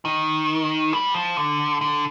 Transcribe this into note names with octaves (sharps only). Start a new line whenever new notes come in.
D#3
G3
F3
D3
D3